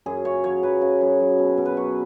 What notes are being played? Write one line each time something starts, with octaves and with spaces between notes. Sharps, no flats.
F#2 G#4
C#3 C#5
F#3 C#5
F#3 B4
C#3
F#2
F#3
B2
B2
B4
F#3 C#5